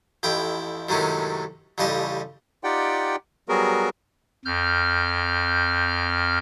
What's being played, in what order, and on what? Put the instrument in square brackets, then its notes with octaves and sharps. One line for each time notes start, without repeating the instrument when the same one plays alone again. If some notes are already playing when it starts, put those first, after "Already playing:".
[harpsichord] A1 F2 E4 G5
F#2 A2 C3 D#3 G#3 C#4
A1 F2 C#3 G3 D#5 A5
[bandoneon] D#4 F4 G4 D5 F#5 G5
F#3 G3 B3 F#4 G#4 A#4
[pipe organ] F2 F6 G6